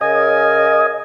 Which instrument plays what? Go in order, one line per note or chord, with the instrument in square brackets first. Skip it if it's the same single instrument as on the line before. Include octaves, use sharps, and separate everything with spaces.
[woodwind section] C#3 A#4 G#5 [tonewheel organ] D#5